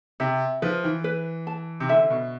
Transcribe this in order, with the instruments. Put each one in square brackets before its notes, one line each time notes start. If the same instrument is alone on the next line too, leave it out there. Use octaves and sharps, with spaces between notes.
[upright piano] C3 [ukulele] E5
[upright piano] F3 [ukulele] B4
[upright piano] E3
[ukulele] B4
A5
[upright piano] C3
[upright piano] D3 [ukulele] E5
[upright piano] B2